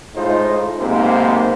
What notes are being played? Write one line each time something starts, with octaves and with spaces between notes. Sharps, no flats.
A2 G#3 D#4 F4 C5
B1 G#2 C3 A#3 C5